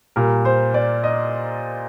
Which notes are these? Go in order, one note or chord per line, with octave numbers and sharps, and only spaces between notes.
A#2 G3 A#4
C5
D5
D#5